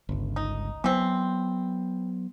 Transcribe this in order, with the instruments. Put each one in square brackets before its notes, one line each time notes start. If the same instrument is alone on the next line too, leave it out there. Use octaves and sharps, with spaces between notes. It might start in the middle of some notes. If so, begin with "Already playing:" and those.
[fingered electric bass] G1 C#2
[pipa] D#4
[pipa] E3 C4 [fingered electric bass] F#3 B3